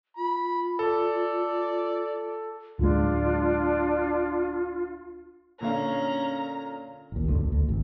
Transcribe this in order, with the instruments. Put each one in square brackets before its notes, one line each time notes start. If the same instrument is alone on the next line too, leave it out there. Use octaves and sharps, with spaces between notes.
[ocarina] F4 [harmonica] B5
[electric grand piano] A4 [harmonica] D5
[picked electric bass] D1 G#3 [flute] D4 [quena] F4
[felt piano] A#2 D3 F5 [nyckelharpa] C#4 C#5 [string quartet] A#5
[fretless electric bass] A1 D#2
D2 G2
D2
D2
G#1